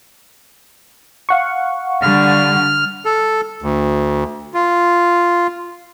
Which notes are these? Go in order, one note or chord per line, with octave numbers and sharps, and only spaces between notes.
F5 F#5 C#6
D3 G3 F6
A4
D2
F4